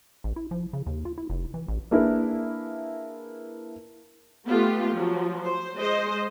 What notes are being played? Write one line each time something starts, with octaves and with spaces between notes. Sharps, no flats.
A1
E4
F3
C#3
D#2
F4
E4
F1
E3
A1
A#3 D4 E4 G#4 A#4 B4
A3 B3 F4 G4
F3 F#3
C5
G#3 C5 D#5